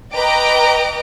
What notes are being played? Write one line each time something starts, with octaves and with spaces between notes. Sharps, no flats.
B4 D#5 G5 A#5 D6 D7